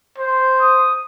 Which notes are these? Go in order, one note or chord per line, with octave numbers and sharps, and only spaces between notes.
C5
D#6